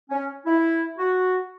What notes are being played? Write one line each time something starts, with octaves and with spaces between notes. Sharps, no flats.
C#4
E4
F#4